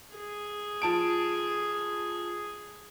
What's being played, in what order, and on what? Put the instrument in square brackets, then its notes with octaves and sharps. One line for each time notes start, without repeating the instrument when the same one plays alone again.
[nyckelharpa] G#4
[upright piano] F3 A5 D7